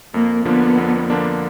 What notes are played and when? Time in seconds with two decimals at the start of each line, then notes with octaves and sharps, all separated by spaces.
0.14 F2 A#3
0.45 D3 F3 A#3 B3 D4
0.77 F2
1.10 D3 F3 A#3 D4